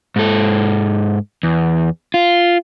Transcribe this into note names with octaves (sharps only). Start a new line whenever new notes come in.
G#2 A4
E2
F4